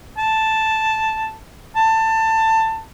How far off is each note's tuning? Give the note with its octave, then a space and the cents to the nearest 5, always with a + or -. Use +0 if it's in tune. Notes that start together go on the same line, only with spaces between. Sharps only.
A5 +0
A5 +20